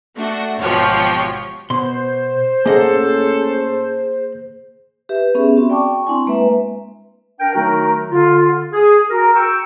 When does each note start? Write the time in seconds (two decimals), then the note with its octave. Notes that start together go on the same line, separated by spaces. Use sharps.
0.16 A3 D4 F#4
0.59 G#1 B2 F3 F#4 G4 C#5
1.70 B2 C5 C6
2.66 A2 A#3 C#4 G#4 A4 D#5 F#5
5.09 G4 B4 E5
5.35 B3 C#4 G#4 E5
5.57 C4 F#4
5.70 D5 G5 A5 C#6 D6
6.07 C4 D4 E4 G#5
6.26 G#3 A#3 B4 E5
7.40 D4 A#4 G5
7.54 D#3 F#3 A3 D#4 F#4 A#4
8.10 D3 F4
8.72 G#4
9.10 F#4 A#4
9.35 G5 C#6 E6